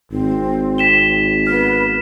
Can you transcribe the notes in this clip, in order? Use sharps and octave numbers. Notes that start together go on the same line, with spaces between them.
G#1 C4
B6 E7 G7
B3 F6